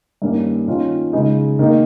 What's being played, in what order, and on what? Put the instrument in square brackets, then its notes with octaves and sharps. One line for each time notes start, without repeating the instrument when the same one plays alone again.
[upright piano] G2 D#3 A#3 C#4
D#3 A#3 C#4 F4
C#3 G#3 D#4
D#3 A#3 D#4